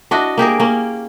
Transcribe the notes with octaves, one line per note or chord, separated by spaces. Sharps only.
D4 E4 F#4 D#5
A#3 G4 G#4 A#4
A#3 C#4